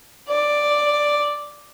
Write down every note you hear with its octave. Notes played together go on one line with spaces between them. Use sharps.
D5